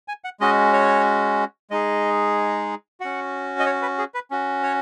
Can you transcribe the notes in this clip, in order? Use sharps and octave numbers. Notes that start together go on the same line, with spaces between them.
G#5
F#5
G#3 C#4 F#4 D#5
C#5
G#3 D#4 G#4 D#5
C#4 F#4 F#5
D#5
C#5
B4
G#4
B4
C#4 F#4
C#5